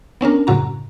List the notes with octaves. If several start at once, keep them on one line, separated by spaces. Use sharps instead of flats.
B3 C#4 D4 A#4
F#2 A2 C#3 F#4 A#5